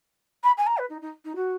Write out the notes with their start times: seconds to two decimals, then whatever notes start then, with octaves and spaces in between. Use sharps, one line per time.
0.43 B5
0.58 G#5
0.67 A#5
0.78 B4
0.90 D#4
1.02 D#4
1.25 D#4
1.36 F#4